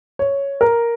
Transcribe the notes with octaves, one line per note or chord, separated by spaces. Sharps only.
C#5
A#4